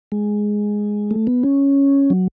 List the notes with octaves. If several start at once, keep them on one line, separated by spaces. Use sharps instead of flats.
G#3
A3
B3
C#4
F#3